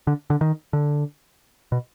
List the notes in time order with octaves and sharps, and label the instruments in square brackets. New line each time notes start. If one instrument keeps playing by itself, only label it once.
[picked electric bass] D3
D3
D#3
D3
B2